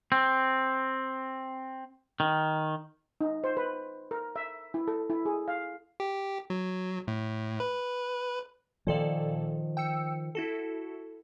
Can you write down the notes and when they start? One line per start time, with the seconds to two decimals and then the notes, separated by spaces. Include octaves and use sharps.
0.12 C4
2.20 D#3
3.21 D#4
3.44 C5
3.57 B4
4.11 A#4
4.36 E5
4.74 E4
4.88 A4
5.10 E4
5.25 G#4
5.48 F5
6.00 G4
6.50 F#3
7.08 A2
7.60 B4
8.87 A#2 D#3 F3 A4 D5
9.77 G5 E6 C#7
10.35 E4 F#4 A4